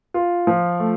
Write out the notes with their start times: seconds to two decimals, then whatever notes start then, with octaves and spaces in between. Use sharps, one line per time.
0.14 F4
0.47 F3
0.79 A3